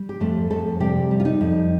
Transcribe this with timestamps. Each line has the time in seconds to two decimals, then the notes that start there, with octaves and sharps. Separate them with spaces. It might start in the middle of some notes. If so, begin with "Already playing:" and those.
Already playing: G3
0.09 G4
0.20 F2 A3 A4
0.50 F2 A3 A4
0.80 C3 G3 G4
1.11 G3
1.20 F4
1.25 D#4
1.41 F2